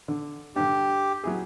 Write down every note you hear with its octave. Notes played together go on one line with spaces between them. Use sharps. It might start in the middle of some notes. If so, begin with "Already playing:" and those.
D3
G2 D3 G4
F#3 E4 G#4